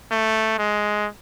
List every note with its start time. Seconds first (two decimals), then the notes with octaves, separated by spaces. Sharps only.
0.11 A3
0.58 G#3